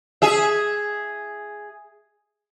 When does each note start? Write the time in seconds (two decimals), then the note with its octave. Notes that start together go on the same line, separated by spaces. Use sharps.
0.22 G#4 E5